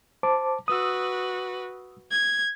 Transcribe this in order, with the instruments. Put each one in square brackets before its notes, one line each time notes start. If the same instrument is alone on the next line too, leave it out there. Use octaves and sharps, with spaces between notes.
[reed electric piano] C5 A5 D6
[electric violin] F#4 B4 [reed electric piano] D#6 E6
[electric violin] G#6